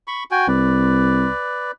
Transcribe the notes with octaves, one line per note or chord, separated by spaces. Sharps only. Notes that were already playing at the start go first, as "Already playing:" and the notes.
B5 C#6
F#4 G5 G#5
C2 B4 D5